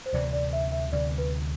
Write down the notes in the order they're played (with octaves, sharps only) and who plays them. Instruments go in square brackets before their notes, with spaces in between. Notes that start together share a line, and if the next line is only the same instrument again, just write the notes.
[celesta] C5
[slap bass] D2 C3 E3 [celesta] D5
[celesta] D5
E5
E5
[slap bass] D2 C3 E3 [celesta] D5
[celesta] B4